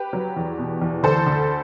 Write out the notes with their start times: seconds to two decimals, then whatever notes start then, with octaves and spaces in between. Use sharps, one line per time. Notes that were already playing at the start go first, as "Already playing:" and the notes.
Already playing: G4 B4
0.13 F#3
0.36 E2
0.58 B2
0.82 E2
1.03 D2 A4 C5
1.26 D2